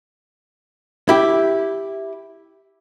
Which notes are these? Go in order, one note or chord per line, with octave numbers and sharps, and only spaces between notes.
E4 G4